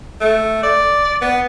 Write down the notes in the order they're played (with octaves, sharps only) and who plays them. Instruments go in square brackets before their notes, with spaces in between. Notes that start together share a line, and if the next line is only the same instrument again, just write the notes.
[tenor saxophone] A3
D5
B3